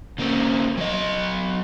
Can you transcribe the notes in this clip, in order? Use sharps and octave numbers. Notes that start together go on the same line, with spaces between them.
C#3 A#3 C4
F#3 D#5